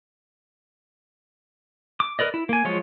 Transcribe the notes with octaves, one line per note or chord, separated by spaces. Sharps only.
D6
A#4 B4 D5 D#5
E4
A#3 G#5
F3 F#3 G#3 F4 C#5